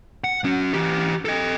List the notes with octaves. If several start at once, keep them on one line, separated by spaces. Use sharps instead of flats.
F#5
F#3 C#4
E3 G4
A4 D#5